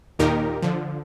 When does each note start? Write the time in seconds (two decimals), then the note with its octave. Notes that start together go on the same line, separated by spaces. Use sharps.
0.19 D#2 A#2 D#3 D#4 G4 A#4
0.62 D3 F3